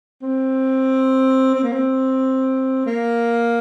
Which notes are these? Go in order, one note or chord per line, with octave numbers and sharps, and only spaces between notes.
C4
C4
A#3
C4
A#3